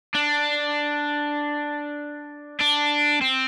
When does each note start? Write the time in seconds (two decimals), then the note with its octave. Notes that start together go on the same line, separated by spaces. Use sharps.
0.15 D4
2.61 D4
3.22 C4